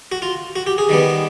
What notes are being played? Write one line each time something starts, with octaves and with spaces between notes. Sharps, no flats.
F#4
F4
F#4
G4
G#4
D#3 G3 B3